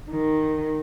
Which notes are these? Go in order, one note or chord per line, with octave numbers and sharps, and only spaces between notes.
D#3